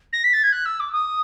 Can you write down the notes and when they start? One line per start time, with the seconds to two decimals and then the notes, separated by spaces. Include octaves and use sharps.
0.13 A#6
0.24 B6
0.33 A6
0.43 G#6
0.52 F#6
0.65 E6
0.80 D6
0.92 D#6